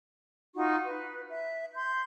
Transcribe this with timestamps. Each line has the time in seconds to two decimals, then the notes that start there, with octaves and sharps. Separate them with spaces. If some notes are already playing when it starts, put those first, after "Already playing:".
0.55 D#4 F4 F#4 C#6
0.86 B4
1.30 E5
1.74 C6 G6